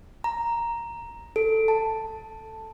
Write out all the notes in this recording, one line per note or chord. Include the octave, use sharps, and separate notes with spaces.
A#5
A4
A5